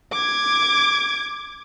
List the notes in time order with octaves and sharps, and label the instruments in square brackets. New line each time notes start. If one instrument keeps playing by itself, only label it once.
[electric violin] D6 G#6